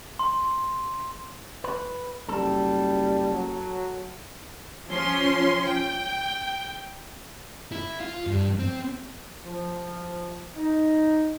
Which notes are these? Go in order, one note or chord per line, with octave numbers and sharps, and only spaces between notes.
C6
B4
F#1 G3 A4
F#3
F3 C#4 C6
G5
E4
F4
G2
C4
F3
D#4